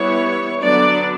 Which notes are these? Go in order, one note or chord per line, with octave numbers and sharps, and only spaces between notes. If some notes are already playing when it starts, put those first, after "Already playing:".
Already playing: E3 G3 B3 E4 C#5
D3 F#3 B3 D4 D5